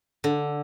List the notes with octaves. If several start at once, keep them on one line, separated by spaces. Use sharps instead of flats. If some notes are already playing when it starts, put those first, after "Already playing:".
D3